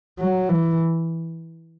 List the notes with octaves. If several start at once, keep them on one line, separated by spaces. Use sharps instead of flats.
F#3
E3